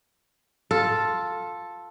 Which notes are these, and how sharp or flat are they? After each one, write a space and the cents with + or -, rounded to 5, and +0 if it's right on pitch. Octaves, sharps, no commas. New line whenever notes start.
F4 +5 A4 +0